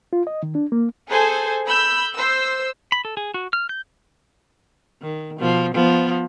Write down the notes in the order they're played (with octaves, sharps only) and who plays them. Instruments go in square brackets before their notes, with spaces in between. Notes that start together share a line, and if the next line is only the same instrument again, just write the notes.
[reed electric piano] F4
D#5
D#3
D4
A#3
[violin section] G#4 A4 C5 G#5
B5 E6 G6
C5 E6
[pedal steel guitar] B5
A4
G#4
F#4
F6
G6
[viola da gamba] D#3
B2 F3
F3 B3